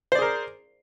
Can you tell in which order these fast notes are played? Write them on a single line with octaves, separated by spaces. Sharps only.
C5 D5 G#4 A#4